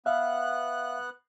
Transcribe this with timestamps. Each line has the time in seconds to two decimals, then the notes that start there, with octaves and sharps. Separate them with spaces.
0.06 B3 E5 F5 F#6